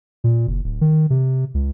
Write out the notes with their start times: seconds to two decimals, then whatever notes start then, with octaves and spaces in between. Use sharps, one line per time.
0.24 A#2
0.47 F#1
0.64 D1
0.81 D#3
1.10 C3
1.54 C#2